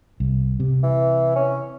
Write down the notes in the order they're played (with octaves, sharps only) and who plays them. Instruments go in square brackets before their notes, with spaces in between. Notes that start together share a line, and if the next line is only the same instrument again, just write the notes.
[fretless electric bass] C2
C3
[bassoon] E3
C#4